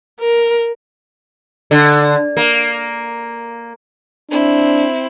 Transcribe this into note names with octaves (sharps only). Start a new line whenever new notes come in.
A#4
D3
A#3
C4 D4 E4